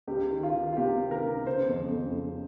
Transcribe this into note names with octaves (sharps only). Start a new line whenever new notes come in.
C#2 G4
D#3
F4
D#3
F4
C3 G4
D#3
A#4
C#2
C#3 C5
F2
F2
C#3